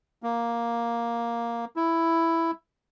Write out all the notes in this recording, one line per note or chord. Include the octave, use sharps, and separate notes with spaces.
A#3
E4